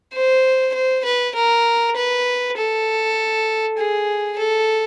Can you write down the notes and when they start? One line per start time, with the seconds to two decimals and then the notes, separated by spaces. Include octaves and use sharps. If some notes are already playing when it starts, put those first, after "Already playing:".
0.14 C5
0.74 C5
1.05 B4
1.35 A#4
1.96 B4
2.57 A4
3.78 G#4
4.38 A4